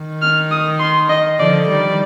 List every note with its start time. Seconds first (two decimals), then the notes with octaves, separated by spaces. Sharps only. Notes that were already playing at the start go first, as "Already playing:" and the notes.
Already playing: D#3
0.22 F6
0.51 D#6
0.80 C6
1.09 D#5
1.39 D3 F3 D5
1.68 D#3 G3 D5